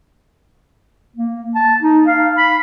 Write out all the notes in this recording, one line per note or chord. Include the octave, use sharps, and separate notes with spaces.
A#3
A5
D#4
F5
B5